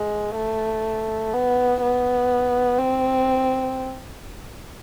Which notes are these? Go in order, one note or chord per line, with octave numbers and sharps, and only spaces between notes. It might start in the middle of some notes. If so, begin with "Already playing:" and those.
Already playing: G#3
A3
B3
B3
C4